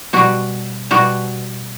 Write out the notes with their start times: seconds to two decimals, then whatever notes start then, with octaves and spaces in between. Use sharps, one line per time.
0.13 B2 G3 F#4
0.91 B2 G3 F#4